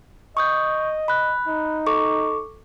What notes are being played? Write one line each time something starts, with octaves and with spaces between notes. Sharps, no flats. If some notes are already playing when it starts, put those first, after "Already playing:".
D#5 C#6 D#6 G6
B5 F#6
D#4
A4 C#6 D6